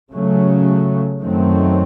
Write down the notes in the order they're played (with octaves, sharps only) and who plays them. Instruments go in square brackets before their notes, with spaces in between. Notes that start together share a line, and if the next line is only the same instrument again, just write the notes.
[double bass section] C#3 F#3 A3 C#4
F#2 D#3 F#3 A3 C4